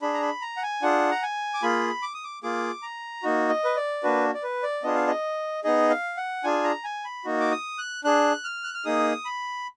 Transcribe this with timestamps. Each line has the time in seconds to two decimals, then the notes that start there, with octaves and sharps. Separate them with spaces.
0.02 D4 G#4 B5
0.14 A#5
0.22 B5
0.41 A#5
0.57 F#5
0.63 G#5
0.82 D4 F4 G#4 F#5
1.11 A#5
1.23 G#5
1.54 D6
1.62 A#3 F4 G#4 B5
2.02 D6
2.14 D#6
2.24 D6
2.43 A#3 F4 G#4 D6
2.82 A#5
3.23 A#3 D#4 F#4
3.49 D#5
3.64 B4
3.76 D5
4.03 A#3 D4 F#4 B4
4.34 D5
4.43 B4
4.63 D5
4.83 B3 D4 F4 G#4 D#5
4.95 F5
5.07 D#5
5.64 B3 D#4 G#4 D#5
5.90 F5
6.17 F#5
6.44 D4 F4 G#4 G#5
6.64 A#5
6.84 G#5
7.05 B5
7.25 A#3 D#4 F#4
7.40 D6
7.51 D#6
7.78 F#6
8.04 D4 G#4 F#6
8.44 F6
8.64 F#6
8.74 F6
8.85 A#3 D#4 G#4 D#6
9.25 B5